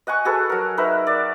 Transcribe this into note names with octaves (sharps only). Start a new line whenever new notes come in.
D#5 F#5 G#5 C#6
F#4 G#4 A4 B4
F#3 A#4
D#4 A#4 B4 E5
D5